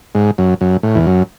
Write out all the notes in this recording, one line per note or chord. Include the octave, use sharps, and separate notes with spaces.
G#2
F#2
F#2
A2
E2
F#2